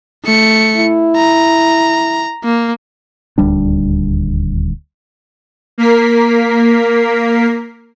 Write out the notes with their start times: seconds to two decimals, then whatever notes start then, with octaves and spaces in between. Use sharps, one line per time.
0.25 A3 C#7
0.77 E4
1.16 A#5
2.44 A#3
3.38 D#1 D2 G3 D4
5.78 A#3 A#4 B6 C7